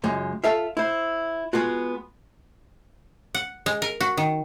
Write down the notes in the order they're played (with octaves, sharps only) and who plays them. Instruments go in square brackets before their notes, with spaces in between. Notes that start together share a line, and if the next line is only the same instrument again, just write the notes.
[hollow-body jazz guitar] C#2 F#2 G#3
F4 A4 E5 F5
E4 C5
G#3 B3 F4 F#4
[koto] F#5
G#3
A#4
F#4
D#3